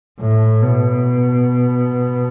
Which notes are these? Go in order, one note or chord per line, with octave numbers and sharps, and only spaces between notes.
A2
B2